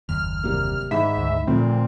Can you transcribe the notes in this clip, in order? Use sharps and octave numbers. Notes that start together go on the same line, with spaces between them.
F#1 D#2 F6
C3 G3 A#3
G#2 D#3 E5 B5
D2
A#2 D3 F3 A3 C4